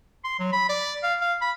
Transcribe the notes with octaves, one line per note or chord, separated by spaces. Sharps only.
C6
F#3
B5
D5
F5
F5
B5